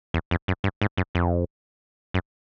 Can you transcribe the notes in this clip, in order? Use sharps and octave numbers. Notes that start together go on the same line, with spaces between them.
E2
F2
F#2
G2
G#2
F#2
F2
F#2